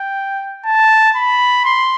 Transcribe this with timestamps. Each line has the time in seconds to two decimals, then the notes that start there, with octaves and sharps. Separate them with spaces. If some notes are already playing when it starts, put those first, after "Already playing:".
Already playing: G5
0.65 A5
1.16 B5
1.65 C6